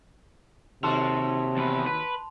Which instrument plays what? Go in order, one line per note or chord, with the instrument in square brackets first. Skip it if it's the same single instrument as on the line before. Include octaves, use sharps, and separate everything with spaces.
[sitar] D#2 F#4 A4 [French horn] C3 [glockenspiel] A5 C6 F7
[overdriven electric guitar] E2 B4
B4